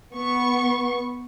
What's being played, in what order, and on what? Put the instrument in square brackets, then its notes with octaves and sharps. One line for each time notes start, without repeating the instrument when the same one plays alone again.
[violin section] B3 C#6